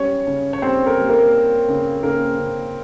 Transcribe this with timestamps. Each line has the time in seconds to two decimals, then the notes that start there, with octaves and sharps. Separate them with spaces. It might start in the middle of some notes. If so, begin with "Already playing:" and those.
Already playing: G3 C#4 C#5
0.27 C#3
0.53 C#5
0.62 G3 C4 C5
0.86 A#3 A#4
0.98 G3
1.09 A#3 A#4
1.33 A#3
1.68 C#3
2.03 C#3 A#3 A#4
2.39 C#3